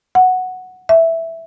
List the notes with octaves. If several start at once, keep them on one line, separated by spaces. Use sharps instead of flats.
F#5
E5